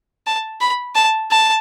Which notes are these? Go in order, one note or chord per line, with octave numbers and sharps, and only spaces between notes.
A5
B5
A5
A5